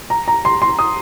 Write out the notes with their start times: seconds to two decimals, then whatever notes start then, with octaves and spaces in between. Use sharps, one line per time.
0.10 A#5
0.28 A#5
0.45 C6
0.62 C6
0.79 D#6